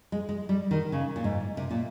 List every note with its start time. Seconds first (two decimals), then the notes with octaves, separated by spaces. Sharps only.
0.12 G#3
0.29 G#3
0.49 G3
0.71 D#3
0.92 C#3
1.16 A#2
1.24 G#2
1.57 C3
1.71 A#2